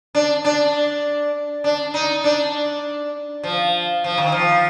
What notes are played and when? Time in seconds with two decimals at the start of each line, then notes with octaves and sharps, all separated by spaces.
0.15 D4
0.45 D4
1.64 D4
1.94 D#4
2.24 D4
3.43 F3
4.04 F3
4.18 D#3
4.32 F3